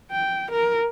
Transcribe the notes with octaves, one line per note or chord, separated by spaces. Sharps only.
G5
A#4